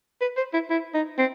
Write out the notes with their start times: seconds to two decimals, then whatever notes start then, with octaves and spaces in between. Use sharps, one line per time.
0.21 B4
0.37 C5
0.53 E4
0.70 E4
0.94 D#4
1.18 C4